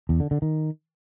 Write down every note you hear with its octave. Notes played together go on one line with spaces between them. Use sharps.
E2
D3
D3
D#3